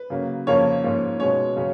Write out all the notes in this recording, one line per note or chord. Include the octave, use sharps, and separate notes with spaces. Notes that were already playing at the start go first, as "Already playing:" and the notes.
Already playing: B4
C#3 F#3 A#3
F2 C#3 F3 A#3 C#5
G#2 F3 A#3 C#4
B2 G#3 C#4 C#5
C#3 F#3 C#4